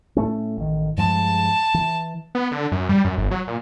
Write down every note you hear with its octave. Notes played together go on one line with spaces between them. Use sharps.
A2 A3 C#4
A1 D#3
G2 F3 G#3 A5
E3
B3
D3
F#2
G3
F#2
G1
F#3
A#2